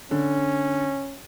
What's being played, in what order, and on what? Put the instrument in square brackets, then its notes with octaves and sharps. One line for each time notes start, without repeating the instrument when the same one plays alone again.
[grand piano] D3 [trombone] C#4